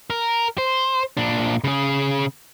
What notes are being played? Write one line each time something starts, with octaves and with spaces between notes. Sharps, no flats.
A#4
C5
A#2 D4
C#3 G#4